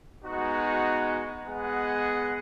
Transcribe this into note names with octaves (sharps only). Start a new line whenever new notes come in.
G#3 B3 D#4 F#4
G#3 B3 G#4 D#5 F#5